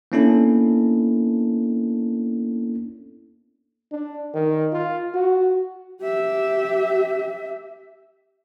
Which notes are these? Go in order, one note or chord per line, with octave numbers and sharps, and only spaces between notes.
A#3 B3 C#4 D4 E4 A4
D4
D#3
F4
F#4
G4 E5